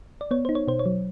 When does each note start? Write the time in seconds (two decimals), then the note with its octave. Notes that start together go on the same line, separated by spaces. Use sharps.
0.21 D5
0.31 B3 C#5
0.45 D#4 C5
0.55 C#5
0.68 B2 C5
0.79 C#5
0.86 F#3